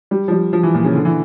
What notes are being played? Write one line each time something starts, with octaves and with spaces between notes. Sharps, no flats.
G3
F3
G3
F3
E3
A#2
C#3
D3
E3